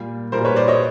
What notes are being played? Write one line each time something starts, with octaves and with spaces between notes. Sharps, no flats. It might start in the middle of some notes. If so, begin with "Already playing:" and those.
Already playing: A#2 G3
A#2 G3 A#4 C5
B4 C#5
C5 D5
C#5 D#5